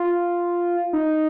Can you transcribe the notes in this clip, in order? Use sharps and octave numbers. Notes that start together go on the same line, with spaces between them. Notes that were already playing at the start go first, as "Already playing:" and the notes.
Already playing: F4
D#4